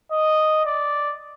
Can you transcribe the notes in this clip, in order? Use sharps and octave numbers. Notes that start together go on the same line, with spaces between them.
D#5
D5